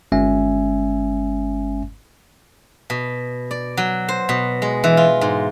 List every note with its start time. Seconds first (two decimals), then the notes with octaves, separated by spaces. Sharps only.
0.12 G1 G#3 C#4 E5 G#5
2.90 B2
3.51 D5
3.77 F#3
4.09 C5
4.29 B2
4.62 G#3
4.84 E3
4.97 F4
5.21 G#2